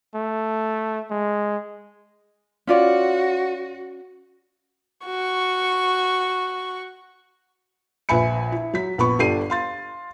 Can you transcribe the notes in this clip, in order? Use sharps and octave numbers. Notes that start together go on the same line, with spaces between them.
A3
G#3
C#4 F4 F#4 D5
F#4 C#6
A#1 B4 E5 G#5 B5 C#7
E4
F#3 B6
A#1 B3 B5 C#6
G1 D4 G4 A4 C7 D#7
F5 C6 A6